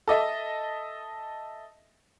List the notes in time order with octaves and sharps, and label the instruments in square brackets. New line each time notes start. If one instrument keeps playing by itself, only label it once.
[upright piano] A4 D#5 E5